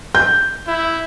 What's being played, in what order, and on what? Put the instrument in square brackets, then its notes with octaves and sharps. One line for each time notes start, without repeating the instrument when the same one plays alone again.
[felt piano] G6
[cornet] E4